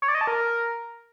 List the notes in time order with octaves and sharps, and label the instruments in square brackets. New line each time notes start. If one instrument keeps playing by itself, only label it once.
[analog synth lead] C#5
D5
D#5
A5
A#4